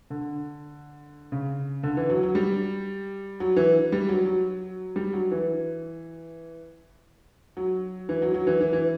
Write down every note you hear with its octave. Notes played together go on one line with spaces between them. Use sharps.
D3
C#3
D3
E3
F#3
F#3
G3
F#3
E3
G3
F#3
F#3
G3
F#3
E3
F#3
E3
F#3
F#3
E3
E3
E3